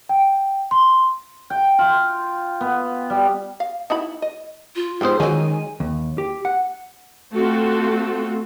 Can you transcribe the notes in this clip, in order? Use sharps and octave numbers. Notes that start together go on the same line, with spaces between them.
G5
C6
G5
F4
B3
G3
F5
D#4 E4 B5
D#5
F4
G#2 B3 C4 G4 C5
D#3 F#3 G#3 C#4 G#5
D#2
G4
F#5
A3 C4 F4 F#4 A4